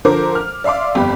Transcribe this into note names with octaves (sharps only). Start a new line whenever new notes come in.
D3 F3 A4 A#4 C5 D6
F6
D5 E5 F5 C6 D6
G1 F2 G4 B5